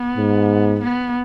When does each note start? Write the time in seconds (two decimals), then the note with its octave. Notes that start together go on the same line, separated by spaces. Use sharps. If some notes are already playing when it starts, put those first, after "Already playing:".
Already playing: B3
0.17 G#2
0.80 B3